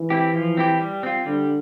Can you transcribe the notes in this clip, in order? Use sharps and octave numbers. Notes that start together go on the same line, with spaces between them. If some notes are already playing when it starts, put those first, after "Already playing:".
Already playing: E3
C4 E4 G4
F3
C4 E4 G4
G3
C4 F4
D3 G3